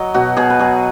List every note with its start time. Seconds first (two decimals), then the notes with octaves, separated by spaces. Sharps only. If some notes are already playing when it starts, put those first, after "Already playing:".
Already playing: F#3 D#5
0.14 B2 F#4
0.36 B2 G#4
0.50 B4
0.59 F#3 G#4